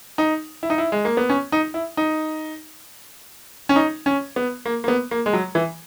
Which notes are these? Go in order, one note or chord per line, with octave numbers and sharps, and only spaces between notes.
D#4
E4
D#4
E4
G#3
A#3
B3
C#4
D#4
E4
D#4
C#4
D#4
C#4
B3
A#3
A#3
B3
A#3
G#3
F#3
E3